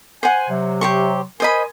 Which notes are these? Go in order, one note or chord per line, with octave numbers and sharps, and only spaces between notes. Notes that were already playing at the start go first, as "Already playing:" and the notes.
C5 F#5 G#5
C3 F#3
G4 C5 C#6
A#4 C5 D#5 G#5 B5